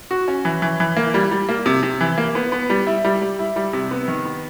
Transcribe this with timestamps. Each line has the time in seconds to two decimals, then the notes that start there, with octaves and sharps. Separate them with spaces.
0.11 F#4
0.28 C#4
0.45 E3
0.62 E3
0.80 E3
0.97 A#3
1.14 G3
1.31 G3
1.49 A#3
1.66 C3
1.83 C3
2.01 E3
2.18 A#3
2.35 B3
2.52 B3
2.70 G3
2.87 E4
3.04 G3
3.22 G3
3.39 E4
3.56 G3
3.73 C3
3.91 B3
4.08 D#3
4.25 B3